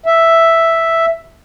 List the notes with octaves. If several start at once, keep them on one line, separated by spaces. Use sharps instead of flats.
E5